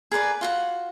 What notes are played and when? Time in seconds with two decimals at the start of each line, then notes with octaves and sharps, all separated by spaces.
0.12 G#4 A#4 B4 D5
0.41 F4 F#4 F#5